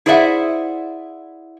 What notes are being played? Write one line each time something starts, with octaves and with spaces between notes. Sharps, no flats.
E4 G#4 C5 D5 E5 F#5